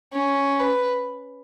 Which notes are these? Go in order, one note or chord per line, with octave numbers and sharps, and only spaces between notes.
C#4
B4